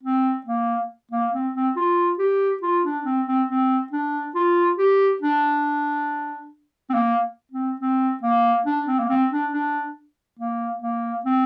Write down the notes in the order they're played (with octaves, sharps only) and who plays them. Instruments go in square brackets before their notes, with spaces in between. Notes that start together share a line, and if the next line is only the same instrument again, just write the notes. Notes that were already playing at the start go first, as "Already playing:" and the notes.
[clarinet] C4
A#3
A#3
C4
C4
F4
G4
F4
D4
C4
C4
C4
D4
F4
G4
D4
C4
A#3
C4
C4
A#3
D4
C4
A#3
C4
D4
D4
A#3
A#3
C4